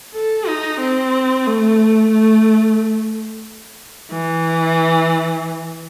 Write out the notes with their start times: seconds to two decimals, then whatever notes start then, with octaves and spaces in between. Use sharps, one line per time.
0.14 A4
0.48 D#4
0.81 C4
1.47 A3
2.12 A3
4.11 E3